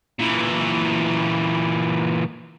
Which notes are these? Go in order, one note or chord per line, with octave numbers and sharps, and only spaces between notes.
A#2 E3